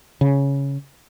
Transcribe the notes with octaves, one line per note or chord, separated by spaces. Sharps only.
C#3